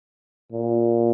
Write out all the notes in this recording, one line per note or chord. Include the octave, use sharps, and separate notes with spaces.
A#2